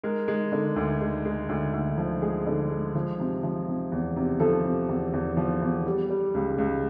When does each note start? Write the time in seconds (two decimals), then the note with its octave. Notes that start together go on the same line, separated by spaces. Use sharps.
0.04 G#3 A#4
0.28 G#3
0.52 D3
0.76 D2
1.01 G#3
1.25 G#3
1.49 D2
1.73 D2
1.98 F3
2.22 G#3 G#4
2.46 D3
2.70 G#3
2.95 F3
3.20 C3
3.43 F3
3.68 C3
3.92 E2
4.16 C3
4.40 F3 A4
4.64 C3
4.89 E2
5.13 E2
5.37 F3
5.61 E2
5.86 G3
6.10 G3
6.35 C#2
6.58 C#2